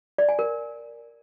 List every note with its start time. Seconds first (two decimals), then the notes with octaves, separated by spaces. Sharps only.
0.18 D5
0.29 G#5
0.39 A#4